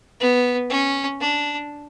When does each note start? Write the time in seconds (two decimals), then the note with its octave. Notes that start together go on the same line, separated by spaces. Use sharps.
0.20 B3
0.70 C#4
1.20 D4